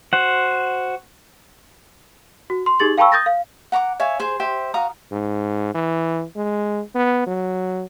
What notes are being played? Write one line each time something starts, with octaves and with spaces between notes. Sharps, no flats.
F#4 C5 F#5
F#4
C6
D#4 G4 G#4 A6 F#7
F5 G5 A5 B5 C#6 E6
D#6 G6 A6 A#6
F5
F#5 A#5 C#6 D6
C#5 E5 F5 G#5
G#4 C5
G4 C5 E5
F#4 F5 A#5 D#6
G#2
E3
G#3
B3
F#3